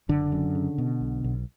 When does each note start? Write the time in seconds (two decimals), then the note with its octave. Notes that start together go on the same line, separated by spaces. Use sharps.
0.09 F#1 D3
0.32 F#2
0.55 C#3
0.78 B2
1.01 B1
1.24 B1